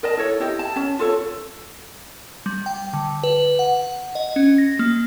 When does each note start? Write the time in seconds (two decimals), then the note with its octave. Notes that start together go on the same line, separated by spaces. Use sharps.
0.03 A#4 D5 D#5 A5
0.17 E4 A4 C#5
0.40 E4 G4 D#5
0.59 A5
0.76 C#4 A5
0.99 F4 A4 C#5
2.46 G3
2.66 G5
2.93 D3
3.23 B4
3.59 F#5
4.15 D#5
4.36 C#4
4.58 A#6
4.79 A#3